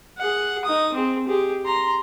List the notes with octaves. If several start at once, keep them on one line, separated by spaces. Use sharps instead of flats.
G#4 F#5
D#4 D#6
C4 G#4
G4 G#4
A#5 C6